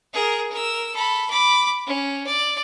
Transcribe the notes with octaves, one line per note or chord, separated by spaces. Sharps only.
G#4 A#4
A#4 E6
A4 B5
B5 D6
C#4
D5